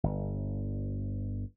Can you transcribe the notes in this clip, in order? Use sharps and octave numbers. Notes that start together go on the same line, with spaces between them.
G1